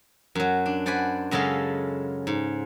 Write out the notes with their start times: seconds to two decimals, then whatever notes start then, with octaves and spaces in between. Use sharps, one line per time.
0.35 F#2 F#3
0.66 D4
0.86 C5 D5 F#5 G#5 B5
1.31 F#2 C#3 G#3 A4 F5
2.27 G#2